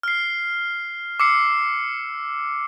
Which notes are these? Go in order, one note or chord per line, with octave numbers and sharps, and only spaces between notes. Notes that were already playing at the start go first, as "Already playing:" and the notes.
F6 C7
D6 E6 C7 C#7